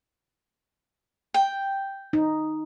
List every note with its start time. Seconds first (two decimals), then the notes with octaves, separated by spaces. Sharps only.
1.34 G5
2.13 D#4